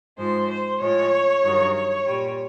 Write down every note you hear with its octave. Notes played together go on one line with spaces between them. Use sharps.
G#2 F3 G#3 C5
C5
A2 F3 G#3 C#5
G2 D#3 F#3
C#5
A#2 G3